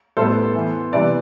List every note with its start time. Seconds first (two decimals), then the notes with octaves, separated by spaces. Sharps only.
0.17 A2 G3 B3 A4 C5
0.55 E3 B3
0.93 C3 E3 G3 B3 B4 D5